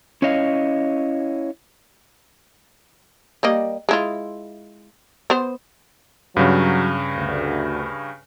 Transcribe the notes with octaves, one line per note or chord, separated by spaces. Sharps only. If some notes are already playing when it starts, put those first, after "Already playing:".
C#4 E4 C#5 D#5 F5
G3 A#3 D#5
G#3 E4 F4
B3 C5
G2 C#3 F#3
D2